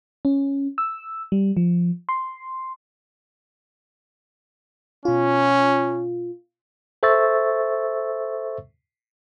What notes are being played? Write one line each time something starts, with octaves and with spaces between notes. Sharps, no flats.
C#4
E6
G3
F3
C6
B2 C#4 F4
A4 C5 E5 C#6 E6 A6